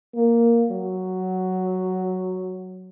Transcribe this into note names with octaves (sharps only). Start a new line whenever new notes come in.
A#3
F#3